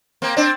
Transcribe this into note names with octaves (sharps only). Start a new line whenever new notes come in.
A#3 C4
C4 D4